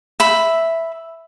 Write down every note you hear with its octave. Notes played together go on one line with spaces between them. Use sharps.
E5 B5